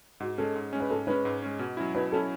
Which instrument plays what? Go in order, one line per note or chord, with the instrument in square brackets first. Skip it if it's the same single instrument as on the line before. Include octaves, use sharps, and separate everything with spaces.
[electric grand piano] G#2 [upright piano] F#4
[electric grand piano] G#3 C#4 [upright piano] A4
[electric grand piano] G#2
G#3 C#4
[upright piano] B4
[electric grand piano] G#2 [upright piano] A4
[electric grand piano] G#3 C#4 [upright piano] B4
[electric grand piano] G#2
G#3 C#4
B2
F#3 C#4 E4
[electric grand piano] B2 [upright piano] B4
[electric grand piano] F#3 C#4 E4 [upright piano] A4